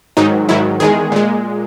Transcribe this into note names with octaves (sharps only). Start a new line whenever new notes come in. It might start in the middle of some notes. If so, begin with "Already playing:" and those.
G#2 D#3 F#3 D#4
G#2 D#3 F#3 E4
E2 D#3 G#3 G#4
A#2 G#3